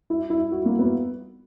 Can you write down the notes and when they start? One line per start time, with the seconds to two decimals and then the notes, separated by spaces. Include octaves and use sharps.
0.10 E4
0.30 E4
0.52 F#4
0.65 A#3
0.79 B3